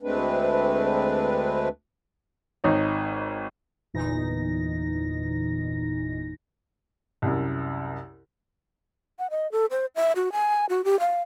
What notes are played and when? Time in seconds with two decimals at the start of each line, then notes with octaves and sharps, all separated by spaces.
0.03 D2 G#3 A3 C4 D4 B4
2.64 G#1 D#4 C#5
3.94 G1 E2 A#2 E3 D#4 A#6
7.22 C2 F#2
9.19 F#5
9.31 D#5
9.52 A4
9.71 C5
9.96 E5
10.16 F#4
10.32 G#5
10.69 F#4
10.85 G4
11.00 F5